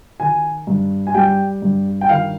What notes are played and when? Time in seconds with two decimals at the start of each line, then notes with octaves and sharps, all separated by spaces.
0.20 D#3 G#5
0.67 G2
1.07 G#5
1.14 G3 G5
1.62 G2
2.01 G5
2.09 D#3 F5